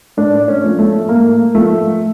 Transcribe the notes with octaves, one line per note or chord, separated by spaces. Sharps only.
A2 D4
C#4
F3 A3
A3
A2 A#3
F3 A3